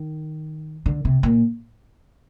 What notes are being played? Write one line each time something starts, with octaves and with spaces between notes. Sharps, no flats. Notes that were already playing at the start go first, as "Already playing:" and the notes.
Already playing: D#3
D3
C3
A#2